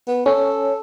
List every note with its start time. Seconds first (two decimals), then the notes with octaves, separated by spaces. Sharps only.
0.08 B3
0.26 C#4 A4